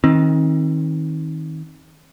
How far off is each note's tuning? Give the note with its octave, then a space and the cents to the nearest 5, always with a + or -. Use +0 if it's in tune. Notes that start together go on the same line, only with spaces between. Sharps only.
D#3 +25 C4 +40